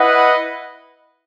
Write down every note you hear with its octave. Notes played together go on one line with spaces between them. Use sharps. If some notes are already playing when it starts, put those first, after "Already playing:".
Already playing: E4 B4 D#5 F#5